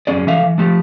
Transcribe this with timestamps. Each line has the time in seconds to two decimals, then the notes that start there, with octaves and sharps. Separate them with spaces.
0.07 F#2 C#4 G#4 D5
0.27 E3 A3 E5 F5
0.43 E3
0.58 F3 A3 G4